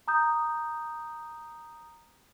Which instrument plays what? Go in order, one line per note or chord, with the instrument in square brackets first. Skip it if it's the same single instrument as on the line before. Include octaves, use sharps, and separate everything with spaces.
[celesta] A#5 D#6 G6